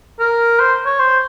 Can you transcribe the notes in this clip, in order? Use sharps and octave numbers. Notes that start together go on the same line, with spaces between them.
A#4
C5
C#5
C5